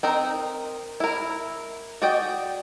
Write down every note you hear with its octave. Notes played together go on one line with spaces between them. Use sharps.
C4 D#4 A#4
E4 A#4
F#4 G#4 D5 D#5 G5